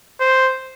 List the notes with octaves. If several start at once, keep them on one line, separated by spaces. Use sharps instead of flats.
C5